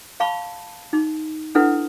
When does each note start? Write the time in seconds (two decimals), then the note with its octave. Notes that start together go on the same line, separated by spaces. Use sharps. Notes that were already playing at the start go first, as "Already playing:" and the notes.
0.20 F5 A5 B5 C#6
0.93 D#4
1.55 D4 E4 A4 B4 F#5